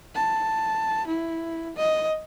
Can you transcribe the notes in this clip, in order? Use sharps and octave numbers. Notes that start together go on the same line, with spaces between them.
A5
E4
D#5